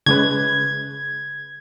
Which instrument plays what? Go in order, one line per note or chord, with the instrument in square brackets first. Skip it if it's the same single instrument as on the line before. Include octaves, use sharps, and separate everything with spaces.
[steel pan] C#3 G#3 B4 [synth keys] G#6